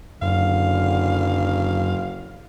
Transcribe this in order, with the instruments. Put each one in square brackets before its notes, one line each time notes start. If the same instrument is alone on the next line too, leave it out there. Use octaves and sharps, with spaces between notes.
[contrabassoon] F#1 [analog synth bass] F#2 [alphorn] D3 [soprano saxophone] F5